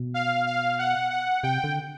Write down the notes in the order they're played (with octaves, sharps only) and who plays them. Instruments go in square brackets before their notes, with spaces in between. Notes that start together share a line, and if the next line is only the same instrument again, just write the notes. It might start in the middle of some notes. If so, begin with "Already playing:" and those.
Already playing: [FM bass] B2
[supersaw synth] F5
F5
F#5
F#5
[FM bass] C3 [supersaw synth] G5
[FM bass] D3